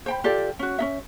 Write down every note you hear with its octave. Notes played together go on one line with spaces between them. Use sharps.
C5 G5 B5
F4 G4 A4 D5
C#4 F#4
C#4 D#4 E5